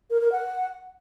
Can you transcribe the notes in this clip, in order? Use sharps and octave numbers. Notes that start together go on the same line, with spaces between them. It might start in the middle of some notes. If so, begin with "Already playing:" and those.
A#4
A#4
F#5